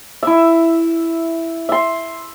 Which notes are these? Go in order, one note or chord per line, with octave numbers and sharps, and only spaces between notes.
E4 E5
E5 C6